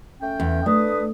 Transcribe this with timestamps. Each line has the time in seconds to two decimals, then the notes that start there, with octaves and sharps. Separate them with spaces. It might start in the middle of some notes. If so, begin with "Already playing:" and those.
0.21 A3 C#4 G5
0.40 E2
0.66 A3 D4 B4 D#6